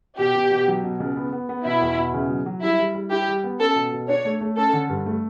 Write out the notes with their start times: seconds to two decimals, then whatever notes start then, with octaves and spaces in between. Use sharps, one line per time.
0.19 B2 G4
0.35 B2
0.51 B2
0.68 F#3
0.84 B2
1.00 C#2
1.16 B3
1.33 B3
1.49 B3
1.65 B2 E4
1.81 E2
1.98 B2
2.14 C#3
2.30 F#3
2.46 F#3
2.62 G3 E4
2.79 G3
2.95 G3
3.11 E4 G4
3.28 G3
3.44 B3
3.59 C#4 A4
3.76 B2
3.92 B2
4.09 D4 C#5
4.25 A3
4.41 A3
4.57 C#4 A4
4.73 D3
4.90 G2
5.06 A3